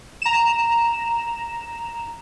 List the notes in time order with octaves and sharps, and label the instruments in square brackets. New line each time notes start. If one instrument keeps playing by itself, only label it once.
[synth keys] A#5 E7